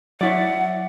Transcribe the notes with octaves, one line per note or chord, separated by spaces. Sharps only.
F#3 E4 C#5 D5 F#5